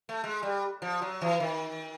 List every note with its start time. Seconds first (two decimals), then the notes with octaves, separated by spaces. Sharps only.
0.09 A3
0.24 G#3
0.43 G3
0.82 F3
1.02 F#3
1.21 E3
1.40 D#3